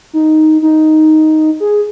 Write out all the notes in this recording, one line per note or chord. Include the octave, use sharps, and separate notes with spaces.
D#4
D#4
G#4